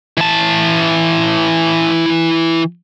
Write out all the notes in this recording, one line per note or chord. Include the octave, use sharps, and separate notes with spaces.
E3 A5